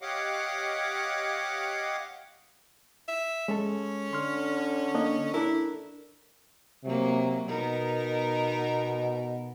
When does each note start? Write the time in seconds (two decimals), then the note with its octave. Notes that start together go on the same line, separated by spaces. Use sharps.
0.02 G4 C#5 D#5 F5 F#5 D6
3.08 E5
3.48 G#3 C#4 A4
4.13 D3 C6 F6
4.95 A#3 D4 D#5
5.34 D4 E4 A4 A#4
6.85 C3 F#3 A#3
7.48 B2 B3 D#4 A#4